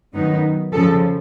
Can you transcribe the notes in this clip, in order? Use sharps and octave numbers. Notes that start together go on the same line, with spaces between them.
F#2 D#3 F#3 B3 D#4
F2 C#3 F3 A4